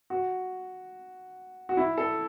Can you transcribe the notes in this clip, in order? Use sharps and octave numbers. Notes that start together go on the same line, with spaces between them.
F#4
F#4
E4
A4